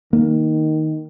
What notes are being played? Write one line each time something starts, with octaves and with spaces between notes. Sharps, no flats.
D#3 A#3